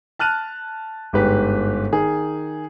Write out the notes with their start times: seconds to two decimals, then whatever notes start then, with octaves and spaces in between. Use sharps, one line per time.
0.19 A5 F6 F#6 D#7
1.13 G1 G#2 G4 B4
1.93 D#3 G#4